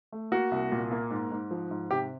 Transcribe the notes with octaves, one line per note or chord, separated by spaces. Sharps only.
A3
A#3 F#4
C2
A#2
A#3
G#2
G#2
F3
G#2
C3 G4